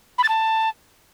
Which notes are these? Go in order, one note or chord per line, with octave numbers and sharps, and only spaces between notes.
B5
A6
A5